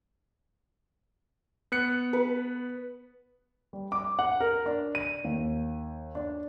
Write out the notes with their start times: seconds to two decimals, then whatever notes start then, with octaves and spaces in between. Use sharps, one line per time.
1.72 B3 F#6 C#7
2.13 B4
3.73 G3
3.92 D6
4.19 F#5
4.40 A#4
4.66 D4
4.95 D#7
5.24 D#2
6.15 D4